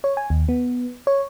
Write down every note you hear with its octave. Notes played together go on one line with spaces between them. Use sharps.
C#5
G#5
D#2
B3
C#5